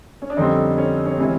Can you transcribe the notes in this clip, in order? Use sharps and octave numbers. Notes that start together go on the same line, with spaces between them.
C#4
D4
F2 D3 G3 C4 C#4 D#4
C#4
C#4
C3 E3 G#3 C#4